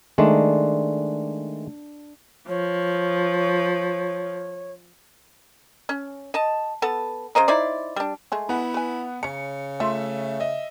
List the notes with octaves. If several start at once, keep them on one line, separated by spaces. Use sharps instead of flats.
D#3 G#3 A3 D4
F3 C#5
C#4
D#5 A5
B3 A4 F#5 A5
C#3 C5 D#5 A#5
D#4 E4 C5 D5
G3 D4
G#3 A3 G#4
B3 E4 F#5
B4 G#5
C#3 C#4 A#5 C#7
A3 F4 E5
D#5 E5